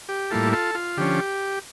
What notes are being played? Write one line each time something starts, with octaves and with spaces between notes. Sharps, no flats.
G4
A2 G3 A#3 E4 F4 A4
F4 A4
F4
D3 F3 C#4 G4